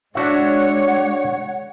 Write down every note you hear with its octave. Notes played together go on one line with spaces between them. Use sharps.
G#3 D4 F#4 C#5 E5 F#5